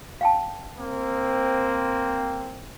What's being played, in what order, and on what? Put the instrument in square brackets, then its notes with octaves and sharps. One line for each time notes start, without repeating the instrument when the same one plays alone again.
[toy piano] F5 G5 A5
[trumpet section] A#3 C4